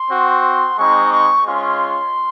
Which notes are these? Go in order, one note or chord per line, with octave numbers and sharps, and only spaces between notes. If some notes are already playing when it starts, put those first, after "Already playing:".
Already playing: C6
C4 F#4
G#3 C4 D#4 C#6
C#6
G#3 C#4 F4 C6